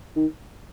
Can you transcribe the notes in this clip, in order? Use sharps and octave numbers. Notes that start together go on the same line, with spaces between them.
D#3